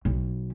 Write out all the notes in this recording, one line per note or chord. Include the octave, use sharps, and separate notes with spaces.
B1